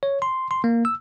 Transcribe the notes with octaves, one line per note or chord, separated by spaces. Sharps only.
C#5
C6
C6
A#3
E6